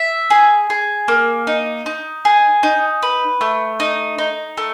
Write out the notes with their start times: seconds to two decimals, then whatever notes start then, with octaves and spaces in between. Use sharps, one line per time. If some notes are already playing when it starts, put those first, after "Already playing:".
Already playing: E5
0.30 G#4
0.70 G#4
1.08 A#3
1.47 D#4
1.86 D#4
2.25 G#4
2.63 D#4
3.02 B4
3.41 A3
3.80 D#4
4.18 D#4
4.57 A3